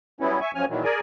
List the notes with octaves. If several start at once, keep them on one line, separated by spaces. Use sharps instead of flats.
F#3 G3 B3 C#4 E4
E5 G#5 C#6
F#2 F3 C#4 G#5 F6
A#2 D#3 E3 F#3
G#4 A#4 D5 G#5